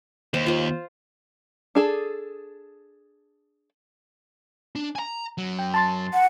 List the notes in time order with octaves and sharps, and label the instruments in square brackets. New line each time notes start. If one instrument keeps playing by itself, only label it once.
[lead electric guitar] D#2 [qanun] C5
[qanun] F4 C5
[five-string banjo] D4 G#4 A4
[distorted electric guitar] D4
G#5 A#5
F#2 F#3
[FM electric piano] G5
A5 C6 A6
[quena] F#5